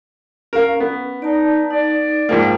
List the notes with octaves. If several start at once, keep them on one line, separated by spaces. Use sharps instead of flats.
C#4 A#4 F5
B3
D#4 D5 A5
D#4 D5
G#2 F3 A#3 G5